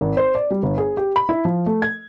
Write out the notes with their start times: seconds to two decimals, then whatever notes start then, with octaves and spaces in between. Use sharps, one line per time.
0.01 G#1
0.17 C5
0.35 D5
0.51 G3
0.63 G1
0.78 G#4
0.97 G4
1.16 B5
1.29 E4
1.45 F3
1.66 A3
1.82 G#6